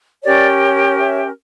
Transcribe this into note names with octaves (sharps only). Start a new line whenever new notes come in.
C#4 G4 A#4 C#5 D5
C#5 E5